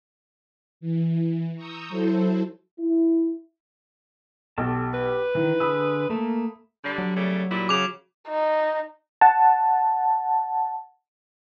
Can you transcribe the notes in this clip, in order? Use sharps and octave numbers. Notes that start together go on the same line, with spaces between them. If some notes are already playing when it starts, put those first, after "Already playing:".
E3
A#5 C#6 D#6 E6 G6
F#3 E4 A4 C5
E4
B1 G4 A4 A5
G4 B4
D#3 E3
D3 G#4 B5 D#6 E6
A3 A#3 A5
D3 G3
F#3
C#3 G3 A3
A#2 G3 E4
C#3 D6 F7
D#4
F#5 A5